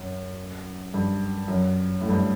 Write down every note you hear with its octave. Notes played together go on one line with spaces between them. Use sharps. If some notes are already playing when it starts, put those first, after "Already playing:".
Already playing: F#2
G2
F#2
A2
G2